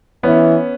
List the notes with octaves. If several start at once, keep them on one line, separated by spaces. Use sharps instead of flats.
E3 B3 C#4